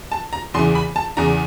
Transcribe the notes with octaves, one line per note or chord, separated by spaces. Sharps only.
A5
A#5
E2 C#3 E3 C6
B5
A5
E2 C#3 E3 A#5